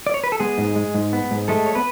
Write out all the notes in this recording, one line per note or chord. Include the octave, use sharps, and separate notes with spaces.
D5
C#5
B4
A4
G#3 B3 G#4
G#2
G#3
G#2
B3
G#2
G#3 A3 A4
C#5
B3 B4